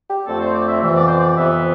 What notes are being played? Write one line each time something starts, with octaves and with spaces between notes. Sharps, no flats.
G4
F2 D3 A3 C4 A4
C5
D5
E5
F2 C3 E3 B3 E5
D5
C5
D5
F2 C3 E3 B3 E5